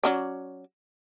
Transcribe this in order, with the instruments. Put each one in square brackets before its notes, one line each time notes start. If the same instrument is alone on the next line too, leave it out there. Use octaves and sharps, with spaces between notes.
[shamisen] F#3 C#4 D5